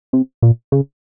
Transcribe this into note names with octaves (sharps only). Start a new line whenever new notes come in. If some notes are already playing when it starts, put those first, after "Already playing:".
C3
A#2
C#3